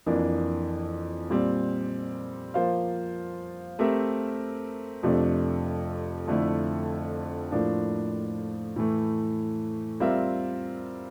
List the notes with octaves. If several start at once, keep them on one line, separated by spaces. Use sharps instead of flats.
F2 E3 A#3 D4
A#2 G3 C4
F3 A#3 F4 C5 F5
A3 C4 G4 A#4 E5
F2 C3 F3 A3 D4
F2 D3 A3 E4
A2 F3 A#3 D4
A2 E3 A3
G3 C4 F4 A#4 E5